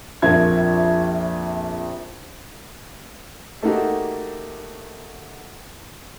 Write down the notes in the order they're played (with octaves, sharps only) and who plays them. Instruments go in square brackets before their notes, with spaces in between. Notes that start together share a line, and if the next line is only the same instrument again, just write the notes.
[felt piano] A#1 F2 F4 A#4 E5 G#6
A3 A#3 D#4 F#4 G4